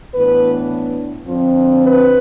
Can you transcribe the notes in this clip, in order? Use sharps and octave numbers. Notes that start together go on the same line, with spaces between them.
A2 E3 B3 D4 B4
F2 D3 F3 C4
B4